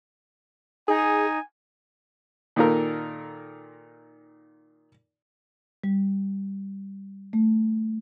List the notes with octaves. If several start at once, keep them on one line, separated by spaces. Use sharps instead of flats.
D#4 G#4 G#5
A#2 D#3 D#4 F4 A4 A#4
G3
A3